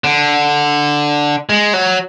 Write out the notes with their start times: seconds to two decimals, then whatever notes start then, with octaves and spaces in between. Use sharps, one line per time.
0.04 D3
1.49 G#3
1.73 F#3